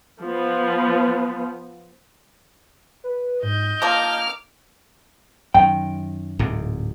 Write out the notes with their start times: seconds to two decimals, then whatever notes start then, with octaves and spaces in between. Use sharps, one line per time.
0.21 F3 B3
3.04 B4
3.43 G#2 D#5 G6
3.82 F3 A#3 A5 D6 F6
5.54 F#2 D#3 G5
6.39 D1 G#2 C3